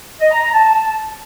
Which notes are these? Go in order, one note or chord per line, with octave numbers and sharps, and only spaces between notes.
D#5
A#5
A#5
A5